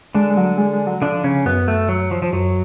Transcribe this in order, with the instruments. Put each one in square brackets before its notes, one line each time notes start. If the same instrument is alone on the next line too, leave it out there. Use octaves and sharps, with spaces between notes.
[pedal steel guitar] D3 D4 [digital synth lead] G#3
[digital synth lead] G#3
F#3
G#3
G#3
F#3
[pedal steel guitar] D3 D4 [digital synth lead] F3
[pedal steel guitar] C#3 C#4
[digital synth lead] F#2 [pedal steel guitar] B3
[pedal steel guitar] A3
F#3
F3
F3
[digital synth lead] F#2 [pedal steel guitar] F#3